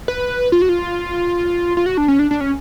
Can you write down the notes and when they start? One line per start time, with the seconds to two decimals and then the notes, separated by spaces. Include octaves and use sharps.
0.08 B4
0.52 F4
0.62 F#4
0.69 F4
1.77 F4
1.86 F#4
1.97 D4
2.08 C#4
2.19 D4
2.31 D4
2.41 C#4